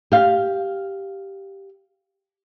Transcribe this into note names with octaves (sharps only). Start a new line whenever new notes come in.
G4 F5